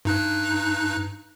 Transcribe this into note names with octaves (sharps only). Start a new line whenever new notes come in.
G2 D#4 F#6